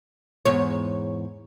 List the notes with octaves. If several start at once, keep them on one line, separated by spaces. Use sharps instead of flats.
E2 G#2 C#5